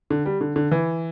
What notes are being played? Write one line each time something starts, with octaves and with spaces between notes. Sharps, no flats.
D3
G3
D3
D3
E3